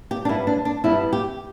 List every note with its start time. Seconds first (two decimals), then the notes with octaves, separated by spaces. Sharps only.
0.11 G4
0.25 D4
0.28 G2 G3 B3 E4
0.47 D4
0.65 D4
0.84 G2 G3 B3 E4
1.13 G4